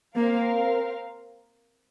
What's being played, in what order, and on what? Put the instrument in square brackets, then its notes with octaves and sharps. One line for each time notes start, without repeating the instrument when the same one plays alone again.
[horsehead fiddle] A#3 [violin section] C4 A#4 F5